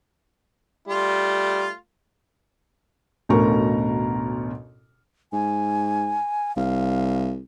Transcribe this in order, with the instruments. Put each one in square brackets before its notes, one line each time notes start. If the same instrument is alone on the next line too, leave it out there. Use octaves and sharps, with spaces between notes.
[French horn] G3 [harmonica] A3 F4
[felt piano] A1 D2 B2 A#4 A#5 C#6
[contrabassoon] G#2 [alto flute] G#5
[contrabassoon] C2 [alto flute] F5